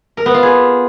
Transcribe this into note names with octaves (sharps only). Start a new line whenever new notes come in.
A#4
B3
F4
G#4